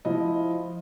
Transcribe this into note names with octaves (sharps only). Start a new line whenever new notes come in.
F3 E4 D#5